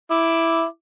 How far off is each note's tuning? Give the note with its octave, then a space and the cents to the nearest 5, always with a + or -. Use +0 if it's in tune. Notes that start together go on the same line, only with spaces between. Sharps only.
E4 +0 D6 +0